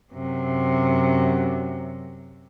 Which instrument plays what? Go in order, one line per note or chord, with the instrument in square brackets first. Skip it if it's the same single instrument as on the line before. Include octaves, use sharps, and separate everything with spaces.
[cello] F#2 C3